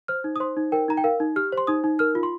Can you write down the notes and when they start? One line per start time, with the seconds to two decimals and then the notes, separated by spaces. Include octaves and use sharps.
0.08 C5 F6
0.24 D#4
0.36 D#6
0.40 C5 C6
0.57 D#4
0.72 A#4 G5
0.88 D#4 A#5
0.97 G5
1.04 A#4 F5
1.20 D#4
1.36 G4 F6
1.52 C5
1.58 C6
1.67 D#4 D#6
1.84 D#4
1.99 A#4 F6
2.15 F4
2.23 C6